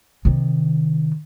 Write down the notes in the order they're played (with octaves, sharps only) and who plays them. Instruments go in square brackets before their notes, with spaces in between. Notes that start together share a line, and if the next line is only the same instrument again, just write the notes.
[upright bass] C3 D#3